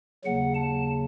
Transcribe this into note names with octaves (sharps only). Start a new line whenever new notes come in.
D#2 C#3 F#3 F#5
A5